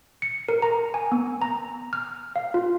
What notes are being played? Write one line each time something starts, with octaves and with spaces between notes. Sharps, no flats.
C#7
A#4
A#5
G#5
B3
A#5
F6
F5
F4